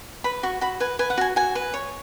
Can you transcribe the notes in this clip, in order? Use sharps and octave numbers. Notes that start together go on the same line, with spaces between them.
B4 B5
F#4 C#6
F#4 B5
B4 G#5
B4 G#5
F#5
F#4 G#5
F#4 G#5
B4
C#5